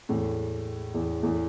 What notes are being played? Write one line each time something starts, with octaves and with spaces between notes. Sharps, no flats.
E2 A2
E2
E2 A2